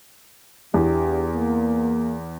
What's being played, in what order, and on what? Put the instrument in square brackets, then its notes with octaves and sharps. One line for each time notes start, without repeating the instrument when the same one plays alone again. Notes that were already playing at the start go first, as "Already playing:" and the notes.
[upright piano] E2 [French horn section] E3 D4 G4
[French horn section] A#3